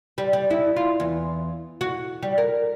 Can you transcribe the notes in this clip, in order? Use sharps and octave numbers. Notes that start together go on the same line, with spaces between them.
G3
G3
E4
F4
E2
F#4
G3
A#4